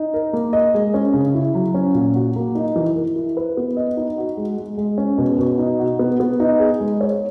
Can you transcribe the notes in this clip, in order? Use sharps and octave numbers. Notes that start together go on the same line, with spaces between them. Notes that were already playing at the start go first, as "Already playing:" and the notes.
Already playing: D#4
A#4
A#3
D#5
G#3
C#4
C#3
E4
F#3
C#4
A#2
F#4
A#3
D#4
E3
A#4
E4
B4
B3
D#5
D#4
F#4
G#3
G#3
G#3
C#4
B2
B2
D#4
F#4
B3
B3
D#4
G#4
G#3
C#5